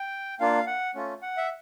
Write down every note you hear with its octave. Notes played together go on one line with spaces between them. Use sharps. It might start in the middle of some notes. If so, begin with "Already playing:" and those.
Already playing: G5
A#3 D4 F4 F5
F#5
A3 C#4 F4
F#5
E5